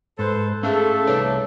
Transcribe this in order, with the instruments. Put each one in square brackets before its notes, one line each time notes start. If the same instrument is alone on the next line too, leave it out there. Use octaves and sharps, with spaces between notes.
[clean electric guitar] G#2 [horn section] A4 B4 C5
[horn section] A3 A4 [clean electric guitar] C#4 A5 [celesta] G#4 E5 F5
[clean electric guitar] C2 D5 A5 [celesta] D#4 B4 C#5